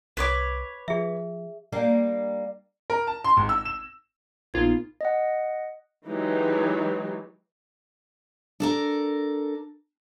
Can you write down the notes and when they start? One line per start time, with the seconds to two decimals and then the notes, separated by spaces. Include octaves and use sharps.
0.17 C2 B4 C#5 D6
0.88 F3 G#4 E5
1.72 G3 A#3 D4
2.90 A#4
3.07 A5
3.24 C6
3.37 G#1
3.49 E6
3.65 E7
4.54 A#1 A#2 B3 D#4 F4 G#6
5.01 D#5 F#5
6.07 E3 F#3 G#3 D#4 G4
8.60 D4 A4 A#4